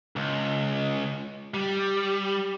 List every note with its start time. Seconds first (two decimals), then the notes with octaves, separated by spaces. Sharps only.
0.16 C#2
1.54 G3